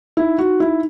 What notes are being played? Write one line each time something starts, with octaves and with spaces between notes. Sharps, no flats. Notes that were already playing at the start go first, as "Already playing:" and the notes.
D#4 E4
D#4 F#4
D#4
E4
D#4